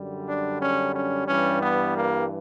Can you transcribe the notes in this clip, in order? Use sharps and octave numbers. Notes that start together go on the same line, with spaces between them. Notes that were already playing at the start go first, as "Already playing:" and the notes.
Already playing: F#2 D3 G3
D4
C#4
C#4
G2 E3 G3 C#4
B3
A#3